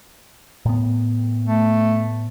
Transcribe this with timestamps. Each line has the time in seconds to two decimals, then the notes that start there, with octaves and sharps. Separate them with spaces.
0.65 A2 B3
1.46 A3